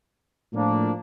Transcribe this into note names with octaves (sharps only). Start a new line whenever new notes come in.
A2 F3 A#3 D4